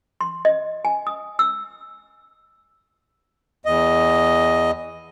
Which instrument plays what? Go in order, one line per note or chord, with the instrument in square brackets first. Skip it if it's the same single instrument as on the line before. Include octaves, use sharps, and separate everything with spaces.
[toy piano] C6
D#5
G#5
D#6
E6
[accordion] E2 D#5